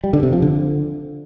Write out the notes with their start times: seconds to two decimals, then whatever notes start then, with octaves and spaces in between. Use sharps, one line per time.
0.04 G3
0.13 D3
0.23 C3
0.33 F3
0.42 D3